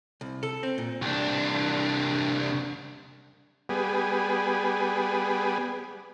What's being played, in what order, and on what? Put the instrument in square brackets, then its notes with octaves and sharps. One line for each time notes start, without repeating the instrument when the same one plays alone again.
[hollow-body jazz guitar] C2
A4
C4
A#2
[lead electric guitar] C2 D4
[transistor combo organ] G3 B3 G#4